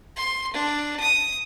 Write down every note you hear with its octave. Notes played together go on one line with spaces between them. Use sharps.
C6
D4
D#6